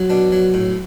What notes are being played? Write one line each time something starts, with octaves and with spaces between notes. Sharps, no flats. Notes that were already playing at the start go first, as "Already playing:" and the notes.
Already playing: F#3
B2 D4
F#3
A2